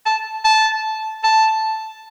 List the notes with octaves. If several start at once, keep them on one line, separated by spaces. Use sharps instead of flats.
A5
A5
A5